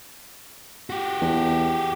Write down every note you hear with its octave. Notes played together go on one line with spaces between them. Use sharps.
F#4 G4
E2